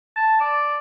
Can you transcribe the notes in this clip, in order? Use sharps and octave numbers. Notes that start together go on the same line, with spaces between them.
A5
D5